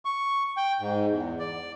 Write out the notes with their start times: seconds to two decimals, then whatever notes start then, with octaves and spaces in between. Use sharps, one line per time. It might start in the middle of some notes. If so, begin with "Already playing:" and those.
0.05 C#6
0.57 G5
0.80 G#2
1.11 E2
1.39 D5